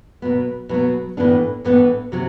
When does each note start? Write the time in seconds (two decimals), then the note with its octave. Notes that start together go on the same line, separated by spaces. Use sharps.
0.22 B2 F#3 B3
0.69 B2 F#3 B3
1.17 A2 E3 B3 D4
1.65 A2 E3 B3 D4
2.12 C3 F#3 C4